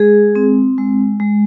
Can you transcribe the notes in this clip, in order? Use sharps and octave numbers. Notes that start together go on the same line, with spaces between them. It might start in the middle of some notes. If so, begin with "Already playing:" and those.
Already playing: G#3 G#4
C4
G#3
G#3